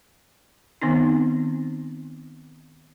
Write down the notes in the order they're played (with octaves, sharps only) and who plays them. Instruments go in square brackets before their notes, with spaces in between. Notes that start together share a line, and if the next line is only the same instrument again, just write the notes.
[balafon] D#3 B3 C4 D#4